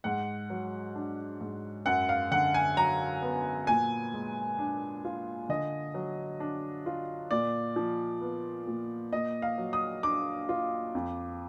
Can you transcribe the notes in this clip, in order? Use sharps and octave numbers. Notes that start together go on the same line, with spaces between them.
G#2 F#5
F#3
D4
G#2
F#2 F#5
F5
D3 F#5
G#5
F#3 A#5
B3
A#2 G#5
G#3
D4
F4
D3 D#5
F#3
D4
F4
A#2 D5
F3
B3
A#2
A#2 D#5
F5
F#3
D#6
D4 D6
F4
F2